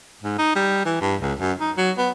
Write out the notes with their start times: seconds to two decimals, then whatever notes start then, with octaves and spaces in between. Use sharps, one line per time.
0.23 G#2
0.38 D#4
0.56 G3
0.86 E3
1.01 G2
1.22 C#2
1.40 F#2
1.60 D#4
1.78 F#3
1.98 B3